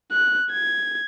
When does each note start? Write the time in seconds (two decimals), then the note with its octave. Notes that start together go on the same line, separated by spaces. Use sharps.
0.12 F#6
0.52 G#6